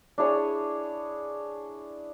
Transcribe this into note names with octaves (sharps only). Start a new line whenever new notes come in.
D4 E4 G#4 C#5